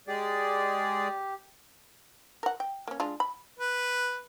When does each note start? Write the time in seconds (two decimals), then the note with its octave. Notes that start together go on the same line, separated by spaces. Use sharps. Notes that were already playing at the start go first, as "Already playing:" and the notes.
0.08 G#3 G4 G#4 D5
2.43 A#4 F#5
2.60 G5
2.88 A#3 C#4
3.00 G#3 D4 F4
3.20 B5
3.58 B4